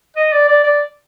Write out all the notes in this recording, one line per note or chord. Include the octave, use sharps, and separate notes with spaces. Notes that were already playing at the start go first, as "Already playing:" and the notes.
D#5
D5
D5
D5